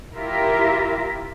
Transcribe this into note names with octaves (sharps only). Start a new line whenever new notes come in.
E4 F4 G4 A#4 E5